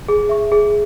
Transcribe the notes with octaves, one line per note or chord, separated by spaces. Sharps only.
G#4
E5 C#6
G#4